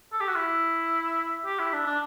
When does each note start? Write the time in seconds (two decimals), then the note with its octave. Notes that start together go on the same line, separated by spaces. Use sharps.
0.13 A4
0.20 G4
0.28 F#4
0.36 E4
1.45 G4
1.59 E4
1.73 D4
1.86 D4